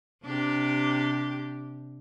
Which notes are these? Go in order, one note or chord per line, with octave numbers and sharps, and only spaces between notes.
C3 D4 G4